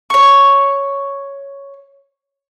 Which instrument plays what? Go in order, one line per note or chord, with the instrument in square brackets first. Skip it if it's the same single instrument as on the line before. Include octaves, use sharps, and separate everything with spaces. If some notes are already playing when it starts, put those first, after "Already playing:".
[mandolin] C#5 C#6